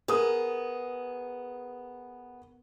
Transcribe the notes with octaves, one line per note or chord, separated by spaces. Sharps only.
B3 G#4 A#4 D#6